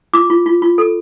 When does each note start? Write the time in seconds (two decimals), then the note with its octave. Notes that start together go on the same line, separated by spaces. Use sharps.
0.13 F4 D6
0.30 F4
0.46 F4
0.62 F4
0.78 A4